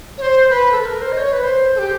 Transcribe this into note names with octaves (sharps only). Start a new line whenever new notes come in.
C#5
C5
B4
A4
B4
A#4
C5
D#5
C#5
B4
C5
A4
G4